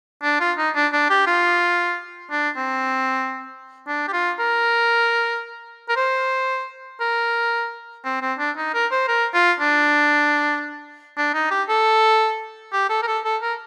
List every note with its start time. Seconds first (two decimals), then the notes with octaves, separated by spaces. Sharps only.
0.23 D4
0.40 F4
0.58 D#4
0.75 D4
0.93 D4
1.10 G4
1.27 F4
2.31 D4
2.57 C4
3.87 D4
4.08 G4
4.13 F4
4.39 A#4
5.89 A#4
5.97 C5
7.01 A#4
8.05 C4
8.22 C4
8.39 D4
8.57 D#4
8.74 A#4
8.91 C5
9.08 A#4
9.34 F4
9.60 D4
11.17 D4
11.34 D#4
11.51 G4
11.69 A4
12.73 G4
12.90 A4
13.03 A#4
13.07 A4
13.25 A4
13.42 A#4